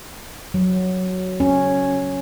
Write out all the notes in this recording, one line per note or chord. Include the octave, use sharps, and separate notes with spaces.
F#3
C#4